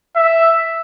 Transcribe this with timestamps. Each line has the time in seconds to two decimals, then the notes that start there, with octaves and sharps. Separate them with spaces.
0.16 E5